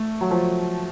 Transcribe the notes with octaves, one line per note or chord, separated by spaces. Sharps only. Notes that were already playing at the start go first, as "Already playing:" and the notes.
Already playing: A3
F#3
F3